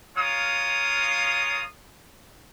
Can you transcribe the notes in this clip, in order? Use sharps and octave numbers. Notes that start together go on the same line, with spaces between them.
G#3 F4 A#4 C#5 F5 D#6